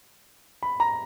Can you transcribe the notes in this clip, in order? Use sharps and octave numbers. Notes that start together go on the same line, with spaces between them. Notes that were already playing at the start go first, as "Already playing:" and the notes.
B5
A#5